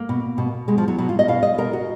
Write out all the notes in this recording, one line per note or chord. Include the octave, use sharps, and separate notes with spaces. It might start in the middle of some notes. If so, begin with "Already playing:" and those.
Already playing: A#3
B2
B2
B2 G#3
F3
F#3
B2 F#3
F4
D#5
B2 F5
D#5
B2 A#4
F#4